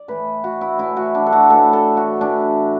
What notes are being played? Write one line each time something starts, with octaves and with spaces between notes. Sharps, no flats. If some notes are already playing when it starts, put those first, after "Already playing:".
Already playing: D5
A2 E3 B4
F#4
E4
A2 E3 E4
F#4
D4
A4
F#4
A2 E3 A4
A4
F#4
A2 E3 D4